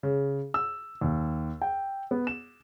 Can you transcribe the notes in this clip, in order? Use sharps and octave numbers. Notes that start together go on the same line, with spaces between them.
C#3
E6
D#2
G5
B3
E7